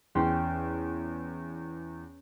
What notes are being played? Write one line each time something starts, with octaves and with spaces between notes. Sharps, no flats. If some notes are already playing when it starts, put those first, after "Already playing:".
E2 C#4 G5 C6